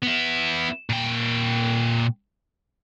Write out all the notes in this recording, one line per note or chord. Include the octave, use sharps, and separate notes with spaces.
B3 E4
A#2 G5